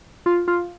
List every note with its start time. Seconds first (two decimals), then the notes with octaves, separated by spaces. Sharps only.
0.26 F4
0.48 F4